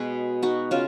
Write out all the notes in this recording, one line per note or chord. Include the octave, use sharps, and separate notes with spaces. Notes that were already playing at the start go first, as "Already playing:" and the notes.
Already playing: B2 G#3 B3 G#4 B4 C#5
D#4 F#4
C#3 C#4 F4